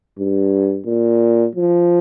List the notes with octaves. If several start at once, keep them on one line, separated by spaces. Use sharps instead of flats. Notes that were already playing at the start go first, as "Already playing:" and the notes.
G2
A#2
F3